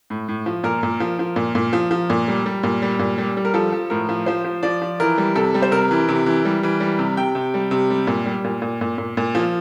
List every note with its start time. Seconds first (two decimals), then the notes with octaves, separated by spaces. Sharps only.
0.10 A2
0.28 A2
0.46 F3
0.64 A#2 A#4
0.83 A#2
1.00 F3
1.19 F3
1.36 A#2
1.55 A#2
1.73 F3
1.91 F3
2.10 A#2
2.28 G3
2.46 G3
2.63 A#2
2.82 G3
2.99 A#2
3.18 G3
3.37 G3
3.45 A#4
3.54 F3 A4
3.72 F3
3.90 A2 A#4
4.09 F3
4.26 F3 C5
4.44 F3
4.63 F3 D5
4.82 F3
5.00 E3 A#4
5.18 G3
5.36 C3 A4
5.55 G3
5.62 C5
5.71 C3 A#4
5.91 E3
6.09 C3
6.26 E3
6.45 G3
6.63 E3
6.80 G3
6.99 C3
7.17 C3 G5
7.35 C3
7.54 G3
7.71 C3
7.90 G3
8.07 A#2
8.26 G3
8.44 A#2
8.62 A#2
8.81 A#2
8.98 A#2
9.17 A#2
9.35 F3